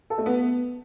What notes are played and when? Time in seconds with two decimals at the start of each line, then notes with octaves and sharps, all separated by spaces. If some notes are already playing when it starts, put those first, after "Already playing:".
0.10 A4
0.18 A3
0.26 B3